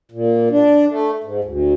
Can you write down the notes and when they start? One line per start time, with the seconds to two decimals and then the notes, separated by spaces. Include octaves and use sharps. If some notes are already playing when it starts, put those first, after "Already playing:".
0.12 A#2
0.50 D4
0.89 A3
1.24 G#2
1.44 D2